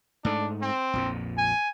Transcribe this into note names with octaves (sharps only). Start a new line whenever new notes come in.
G#2 A3 D4
C4
A#1 F2 A#2
G#5